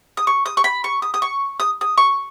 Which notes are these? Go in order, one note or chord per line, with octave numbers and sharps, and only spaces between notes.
D#6
C#6
D#6
C#6
B5
C#6
D#6
D#6
C#6
D#6
D#6
C#6